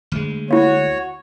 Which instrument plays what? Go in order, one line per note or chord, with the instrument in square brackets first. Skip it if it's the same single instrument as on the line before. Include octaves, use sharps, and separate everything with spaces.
[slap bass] D2 G#3
[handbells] A#3 E4 [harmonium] F#4 C#5